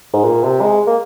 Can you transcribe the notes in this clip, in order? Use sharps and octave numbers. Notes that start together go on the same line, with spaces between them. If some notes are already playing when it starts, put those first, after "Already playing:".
G#2
A#2
C3
G#3
A#3